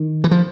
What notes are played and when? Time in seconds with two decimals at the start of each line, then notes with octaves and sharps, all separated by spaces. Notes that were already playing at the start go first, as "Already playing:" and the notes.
Already playing: D#3
0.24 E3
0.31 F3